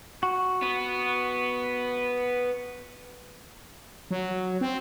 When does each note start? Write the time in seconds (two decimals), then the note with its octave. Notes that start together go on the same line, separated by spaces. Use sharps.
0.23 F#4
0.62 B3
4.11 F#3
4.61 C4